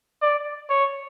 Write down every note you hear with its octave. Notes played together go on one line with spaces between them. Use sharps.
D5
C#5